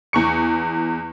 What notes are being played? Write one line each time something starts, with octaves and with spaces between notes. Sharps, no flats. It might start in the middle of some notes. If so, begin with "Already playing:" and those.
E2 C#6 C#7